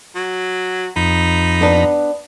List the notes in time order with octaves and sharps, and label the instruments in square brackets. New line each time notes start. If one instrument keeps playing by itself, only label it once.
[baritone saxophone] F#3
[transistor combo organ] F2 A#5 B5 [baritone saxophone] D#4
[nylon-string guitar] B3 D4 B4